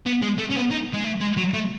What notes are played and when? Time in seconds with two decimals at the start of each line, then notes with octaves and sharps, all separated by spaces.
0.06 B3
0.22 G#3
0.39 A3
0.51 C#4
0.56 B3
0.71 D#4
0.94 G#3
1.05 A3
1.21 G#3
1.37 F#3
1.54 A3